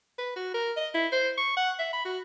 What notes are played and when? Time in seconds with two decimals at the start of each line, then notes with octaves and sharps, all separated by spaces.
0.19 B4
0.36 F#4
0.54 A#4
0.77 D#5
0.94 E4
1.12 C5
1.38 C#6
1.57 F#5
1.79 E5
1.93 B5
2.05 F#4